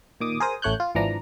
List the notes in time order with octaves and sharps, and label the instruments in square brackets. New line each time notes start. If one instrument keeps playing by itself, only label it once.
[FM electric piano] A#2 D#3 D6 D#6
G#4 A#4 C5 D#6
A1 A3 C#5 F#6 G6
F4
G#1 E3 F3 D4 A#5